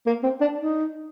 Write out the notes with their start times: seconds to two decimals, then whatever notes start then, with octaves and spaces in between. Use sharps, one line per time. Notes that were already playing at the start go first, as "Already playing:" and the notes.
0.07 A#3
0.23 C4
0.41 D4
0.58 D#4